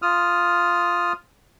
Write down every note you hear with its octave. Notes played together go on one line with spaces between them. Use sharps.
F4 D#6 F6